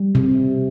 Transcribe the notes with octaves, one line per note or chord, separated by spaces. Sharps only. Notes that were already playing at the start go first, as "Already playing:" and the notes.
Already playing: G3
C3